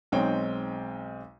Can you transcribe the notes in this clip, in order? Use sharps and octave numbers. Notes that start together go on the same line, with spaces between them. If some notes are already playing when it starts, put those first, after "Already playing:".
B1 G#3 C4 D#4 C#5 G5